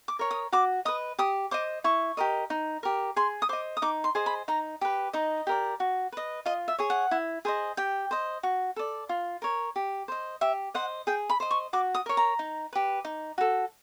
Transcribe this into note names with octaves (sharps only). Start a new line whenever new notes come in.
D6
A#4 C#5
D#6
F#4 D6
B4 D#5 D#6
G4 D#6
C5 D#5 D6
E4 C#6
G4 A#4 D#5
D#4
G4 A#4
G#4 C6
D#6
C5 D#5 D6
D#6
D#4 D6
C6
G#4 C5 D#5
B5
D#4 A#5
G4 B4
D#4 D#5
G4 A#4 D5
F#4
B4 D#5
F4 D#5
E5
G#4 C#5
F#5
E4
G#4 C5 D#5
G4 G5
C5 D#5
F#4
A4 D5
F4
A#4 C#5
G4
C5 D#5
G4 E5
C5 D#5 F#5
G#4 G5
B5
C5 D#5
C#6
F#4 D6
D#6
A#4 C#5
A#5
D#4
G4 B4
D#4
F#4 A4